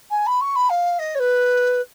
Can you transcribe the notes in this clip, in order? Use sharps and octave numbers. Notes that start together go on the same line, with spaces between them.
G#5
B5
C#6
B5
F5
D#5
C#5
B4